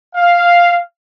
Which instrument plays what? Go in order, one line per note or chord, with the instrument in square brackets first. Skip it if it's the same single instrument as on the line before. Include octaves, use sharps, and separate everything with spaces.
[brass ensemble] F5